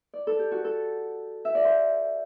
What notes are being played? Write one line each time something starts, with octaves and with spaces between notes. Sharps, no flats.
D5
A4
G4
F#4
A4
E5
D5
C5